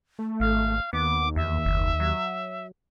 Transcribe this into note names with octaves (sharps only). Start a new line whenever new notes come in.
A3
G#1 F5
D#2 B3 D6
E2 E5
F#1
F#3